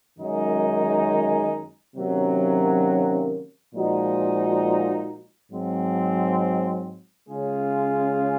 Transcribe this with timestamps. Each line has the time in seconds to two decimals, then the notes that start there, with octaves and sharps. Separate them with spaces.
0.18 F#2 D#3 G#3 D#4 G#4
1.95 C3 D#3 F#3 A#3 C#4
3.73 A#2 F3 G#3 D#4 F#4
5.51 G#2 F#3 C4
7.28 C#3 G#3 C#4 F4 G#4